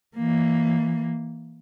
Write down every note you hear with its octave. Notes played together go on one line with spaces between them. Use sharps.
E3 A#3